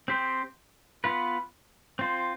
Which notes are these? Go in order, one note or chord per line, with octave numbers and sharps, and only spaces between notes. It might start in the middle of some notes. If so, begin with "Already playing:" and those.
C4 G4 C5
B3 F4 B4
C4 F4 C5